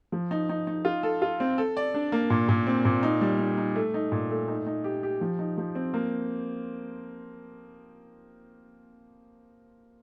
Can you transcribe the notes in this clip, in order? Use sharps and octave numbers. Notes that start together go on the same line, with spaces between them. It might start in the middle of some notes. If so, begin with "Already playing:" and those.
F3
D#4
D#4
D#4
F4
A4
F4
C4
A4
D5
D4
A#3
A#2
A#2
C4
A#2
D#4
G3
D#4
D#4
A3
D#4
A#2
A3
D#4
D#4
G4
G4
F3
D#4
F3
C4
A#3